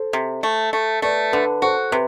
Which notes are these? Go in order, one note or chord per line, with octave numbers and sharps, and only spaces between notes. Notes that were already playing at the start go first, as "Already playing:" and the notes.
Already playing: A4 C5
C3
A3
A3
A3 B4 D5
D3 B4
F#4 A4 C5
C3 B4